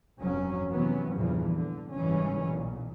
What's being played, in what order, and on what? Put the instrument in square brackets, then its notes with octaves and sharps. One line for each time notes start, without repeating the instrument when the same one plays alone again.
[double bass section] F1 G2 F#3 C#4
C3 E3 F#3 B3 C#4
E2 G2 A#2 C#3 E3 F3
D3
F#1 G#2 E3 G3 C#4
B1 A#2